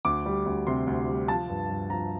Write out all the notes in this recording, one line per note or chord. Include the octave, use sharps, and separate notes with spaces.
D2 D6
G3
D2
C3 C6
D2
G3
F3 A5
G2
G2
F3 A#5